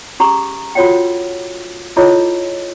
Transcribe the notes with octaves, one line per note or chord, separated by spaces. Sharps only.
C#4 G4 G#4 A#5 C#6 D#6
F4 F#4 A4 C#5 F#5 G5
E4 F4 G#4 A4 C#5 D#5